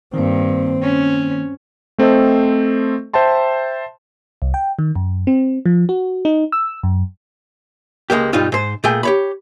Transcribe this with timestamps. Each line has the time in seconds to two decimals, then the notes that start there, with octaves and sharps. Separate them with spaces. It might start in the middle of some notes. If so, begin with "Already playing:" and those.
0.14 G2 D#3 A#3 C4
0.82 C#4
1.98 A3 C4 A4 C5 D#5
3.13 C5 E5 G5 A5 C6
4.42 C2
4.54 G5
4.79 D#3
4.95 F#2
5.27 C4
5.66 F3
5.89 F#4
6.25 D#4
6.52 E6
6.83 F#2
8.10 C#2 G#3 A#3 G4
8.33 B1 G2 G3 D#4 F4
8.52 G#2 C5
8.84 A#2 A3 G#4 G5
9.03 G4 C#5 B5